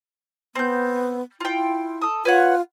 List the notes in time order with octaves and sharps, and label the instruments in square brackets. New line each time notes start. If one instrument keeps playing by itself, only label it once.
[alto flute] B3 [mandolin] C4 G6
[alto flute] E4 [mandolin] F4 G5
[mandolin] A4 D#6
[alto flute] F4 [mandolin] B4 C#5 F#5